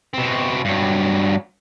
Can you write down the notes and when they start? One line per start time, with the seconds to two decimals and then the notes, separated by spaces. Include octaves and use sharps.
0.14 B2 C4
0.65 G2 F#3